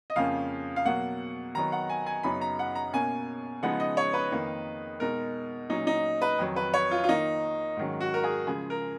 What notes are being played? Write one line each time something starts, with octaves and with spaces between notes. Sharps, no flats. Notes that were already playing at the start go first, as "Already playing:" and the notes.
D#5
F2 C#3 F3 A#3 C#4 F5
F5
B2 F#3 A#3 F#5
D#3 F#3 B3 D#4 A#5
F#5
G#5
G#5
F#2 C#3 F#3 B3 D#4 B5
A#5
F#5
A#5
B2 A#3 C#4 G#5
C#3 F3 G#3 B3 D#4 F#5
D#5
C#5
B4
F2 D#3 A#3 D#4
B2 G#3 D#4 A#4
A#2 F#3 C#4 D#4
D#4
B4
F2 D#3 F#3
B4
C#5
F4
F4
D#3 A#3 D#4
G#2 D#3 F#3 C#4
F#4
A#4
G#4
C#3 F3 G#3 G#4
A#4